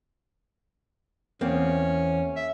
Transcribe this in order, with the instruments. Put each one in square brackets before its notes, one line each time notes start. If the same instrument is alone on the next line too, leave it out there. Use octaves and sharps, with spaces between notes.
[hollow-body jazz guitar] E2 A#3 C4 [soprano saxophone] C#4
[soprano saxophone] E5